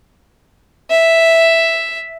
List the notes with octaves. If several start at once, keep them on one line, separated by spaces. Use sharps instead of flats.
E5